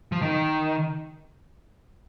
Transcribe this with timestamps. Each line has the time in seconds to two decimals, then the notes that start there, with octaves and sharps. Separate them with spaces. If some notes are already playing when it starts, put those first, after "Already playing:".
0.12 F3
0.22 D#3